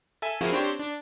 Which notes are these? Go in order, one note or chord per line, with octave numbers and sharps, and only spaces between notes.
A4 E5 G#5
F3 A#3 C4 E4 F#4 G#4
C4 D4 G4 C5 C#5
D4